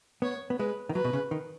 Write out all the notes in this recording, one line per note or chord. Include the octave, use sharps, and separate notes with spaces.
B3 C#5
B3
G#3 B4
D#3
F#3 B4
B2
C#3
D#3